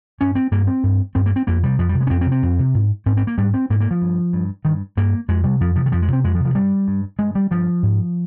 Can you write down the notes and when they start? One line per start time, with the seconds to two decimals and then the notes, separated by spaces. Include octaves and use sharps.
0.20 G2 C#4
0.35 C4
0.51 G2 A#3
0.67 C4
0.83 G2
1.15 G2 C4
1.26 A#3
1.36 C4
1.47 F2 A#3
1.63 C3 G3
1.79 F2 F3
1.89 G3
1.94 C3
2.00 G#3
2.07 C#4
2.10 F2 C4
2.21 C4
2.26 C3
2.32 C4
2.42 F2
2.59 C3
2.74 G#2
3.06 G#2 C4
3.17 C4
3.27 A#3
3.38 G#2 G3
3.54 C4
3.70 G#2 A#3
3.80 A#3
3.91 F3
4.02 G2
4.33 G2
4.65 G2 D#3
4.97 G2 A#3
5.28 F2 G#3
5.44 C3 G3
5.60 F2 F3
5.75 C3 F3
5.86 D#3
5.92 F2 F3
6.02 G#3
6.08 C3
6.13 C4
6.24 F2 G#3
6.34 F3
6.40 C3
6.45 F3
6.55 G2 G3
6.88 G2
7.19 G2 G#3
7.35 G3
7.51 G2 F3
7.83 G#2